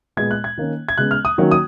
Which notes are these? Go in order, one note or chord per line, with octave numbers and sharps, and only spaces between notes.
A#2 G#3 B3 G#6
F#6
G#6
D#3 A#3 C#4
G#6
C#3 G#3 B3 F#6
F6
D#6
D#3 F#3 A#3 C#4
D#6